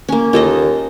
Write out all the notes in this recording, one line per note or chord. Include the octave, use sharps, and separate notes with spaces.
A#3 C#4
D#2 F4 A4 D#5